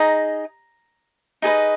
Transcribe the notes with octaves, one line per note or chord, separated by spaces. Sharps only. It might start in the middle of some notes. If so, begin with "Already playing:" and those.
Already playing: D#4 G#4 D#5 A#5
D#4 G#4 B4 D#5